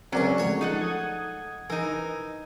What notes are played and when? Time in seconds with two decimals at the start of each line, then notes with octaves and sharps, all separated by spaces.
0.13 C#2 F#2 F#3 C4 D5 C#6
0.38 F3 G#3 A3 C#5 C#6
0.61 D#4 A4 F#5
0.81 D#6 G#6
1.70 E3 D#4 A#4